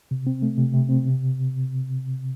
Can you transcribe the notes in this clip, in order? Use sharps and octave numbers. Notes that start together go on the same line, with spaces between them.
C3
C4
A3
C3
C3
C4
C3